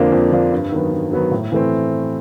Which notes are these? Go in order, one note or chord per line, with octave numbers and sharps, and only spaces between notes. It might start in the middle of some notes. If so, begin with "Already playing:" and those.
Already playing: F2 D3 F3 A#3 D4
F2
D3 F3 A#3 D4
G2
D#3 F#3 B3
G2
D#3 F#3 B3
A2
E3 A3 C4